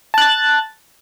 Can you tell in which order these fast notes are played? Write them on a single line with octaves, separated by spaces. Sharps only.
A5 F#6 A6